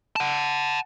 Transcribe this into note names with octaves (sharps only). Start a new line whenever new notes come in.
F#5 A5